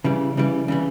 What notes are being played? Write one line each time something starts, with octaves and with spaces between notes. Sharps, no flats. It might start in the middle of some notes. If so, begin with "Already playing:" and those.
C#3 E3 G3
C#3 E3 G3
C#3 E3 G3